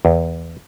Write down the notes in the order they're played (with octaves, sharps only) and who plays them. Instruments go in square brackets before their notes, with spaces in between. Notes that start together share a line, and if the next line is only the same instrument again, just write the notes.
[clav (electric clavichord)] E2